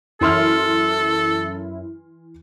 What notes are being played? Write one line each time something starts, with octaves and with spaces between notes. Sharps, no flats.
F#2 E3 E4 A4 C6 F6